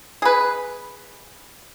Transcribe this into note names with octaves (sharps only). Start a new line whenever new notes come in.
G#4 B4